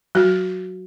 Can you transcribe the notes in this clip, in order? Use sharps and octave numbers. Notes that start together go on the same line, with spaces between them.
F#3 F#4